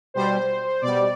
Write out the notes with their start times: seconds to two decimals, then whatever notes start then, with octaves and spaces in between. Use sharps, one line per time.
0.14 B2 G3 C5
0.82 B2 G3 D5